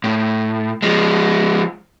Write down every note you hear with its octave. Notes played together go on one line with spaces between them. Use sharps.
A2
F3 G#3